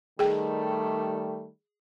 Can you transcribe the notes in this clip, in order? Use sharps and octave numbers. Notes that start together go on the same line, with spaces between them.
D#3 G3 A3 G#4 G5